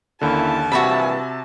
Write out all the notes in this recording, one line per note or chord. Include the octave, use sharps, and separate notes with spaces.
D#2 D3 A#3 C#4 E4 A5
A#1 G2 C3 E3 F#4 E5 B5